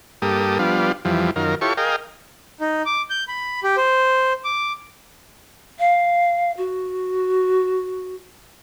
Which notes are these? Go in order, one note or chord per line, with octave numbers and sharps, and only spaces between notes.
G2 A#3 G4 A4 D#6
F3 G3 B3 D4 F4
F2 E3 F3 G3
F#2 D#3 F4 A#4
E4 F4 G4 A4 C#5 C#6
G#4 A#4 D#5 F5 G5
D#4
D6
G6
B5
G4
C5
D6
F5
F#4